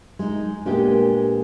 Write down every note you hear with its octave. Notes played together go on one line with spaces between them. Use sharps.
G#3 D#4
A#2 G#3 A#3 B3 D4 G4